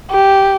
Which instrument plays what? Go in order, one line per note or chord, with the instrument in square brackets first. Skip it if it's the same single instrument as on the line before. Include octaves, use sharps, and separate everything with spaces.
[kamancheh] G4